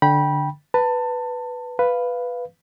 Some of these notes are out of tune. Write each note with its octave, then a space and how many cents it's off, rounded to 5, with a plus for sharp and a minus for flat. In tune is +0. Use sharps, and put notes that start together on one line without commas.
D3 +0 G5 +0 B5 -25
B4 +0 A5 +25
B4 +0 F5 +0